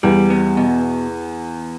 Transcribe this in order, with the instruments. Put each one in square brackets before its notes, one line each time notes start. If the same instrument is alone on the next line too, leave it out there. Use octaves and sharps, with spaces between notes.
[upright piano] E2 [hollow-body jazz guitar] G3
[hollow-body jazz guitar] B3
B2